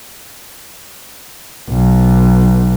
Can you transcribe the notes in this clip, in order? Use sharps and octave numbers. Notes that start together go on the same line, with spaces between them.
B1